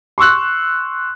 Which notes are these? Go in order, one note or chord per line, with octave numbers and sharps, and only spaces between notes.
C6 C#6 E6 F#6